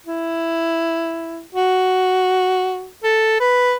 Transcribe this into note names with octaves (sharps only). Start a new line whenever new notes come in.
E4
F#4
A4
B4